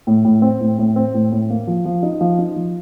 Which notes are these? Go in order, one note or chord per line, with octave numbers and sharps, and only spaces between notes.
A2
A2
C4
A2
A2
C4
A2
A2
A#3
F3
F3
D#4
F3
D#4
F3